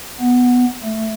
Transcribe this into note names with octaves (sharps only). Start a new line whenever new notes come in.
B3
A3